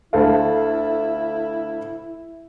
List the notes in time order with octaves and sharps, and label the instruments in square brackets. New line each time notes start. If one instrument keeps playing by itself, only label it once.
[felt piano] D2 A4 F5 [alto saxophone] E4